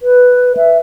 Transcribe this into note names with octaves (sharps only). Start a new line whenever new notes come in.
B4
E5